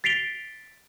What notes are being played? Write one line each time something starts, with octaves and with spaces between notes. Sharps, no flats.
A6 B6 C7 D7 F7 G7